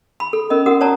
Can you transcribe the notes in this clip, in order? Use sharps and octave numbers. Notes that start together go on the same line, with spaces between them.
B5
A4
C#4 A#4 D#5
F#4 A#4 F#5 D#6
C#5 D5 A5 A#5